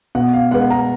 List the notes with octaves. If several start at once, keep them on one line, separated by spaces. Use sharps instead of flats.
B2 F#5
F5
G#3 B3 F#5
A#5